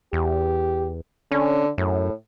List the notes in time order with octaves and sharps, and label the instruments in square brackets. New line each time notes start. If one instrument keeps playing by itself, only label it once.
[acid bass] E2 [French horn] G4
[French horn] D3 [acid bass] C#4
[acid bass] F#2 [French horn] A2